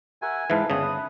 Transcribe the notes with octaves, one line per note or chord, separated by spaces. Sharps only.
G4 A#4 E5 F#5 G#5 A#5
G#2 E3 B4 E5 F5 A5 C6
G1 C#3 C#5 A5 C#6 D#6
B4